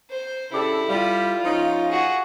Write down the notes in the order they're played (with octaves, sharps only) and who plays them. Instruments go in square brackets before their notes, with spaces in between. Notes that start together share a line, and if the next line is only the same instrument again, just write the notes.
[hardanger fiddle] C5
[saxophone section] C#3 D4 G4 [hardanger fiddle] E4 [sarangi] A4
[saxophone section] G3 [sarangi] F4
[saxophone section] F3 C#4 D#4
[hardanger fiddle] F#4 G#4